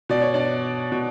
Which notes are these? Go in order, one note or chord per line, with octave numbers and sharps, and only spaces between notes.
B2 D5
C#5
D4 D5
B2